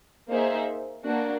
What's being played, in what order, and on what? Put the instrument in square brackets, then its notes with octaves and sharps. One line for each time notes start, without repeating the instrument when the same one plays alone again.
[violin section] A#3 D#4 G#4 C5 E5
A#3 D4 F#4